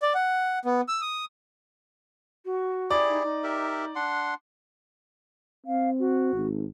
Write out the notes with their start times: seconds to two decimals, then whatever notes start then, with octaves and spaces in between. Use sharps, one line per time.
0.02 D5
0.15 F#5
0.65 B3
0.88 E6
1.01 D#6
2.45 F#4
2.90 E4 G4 G#4 D5
3.09 D#4
3.23 D#4
3.43 G4 A#4 E5
3.95 D4 F#5 C6
5.66 C4 F5
6.00 F#4
6.34 G#1